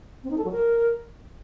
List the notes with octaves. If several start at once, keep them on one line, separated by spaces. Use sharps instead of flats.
C4
D#4
A4
F#3
A#4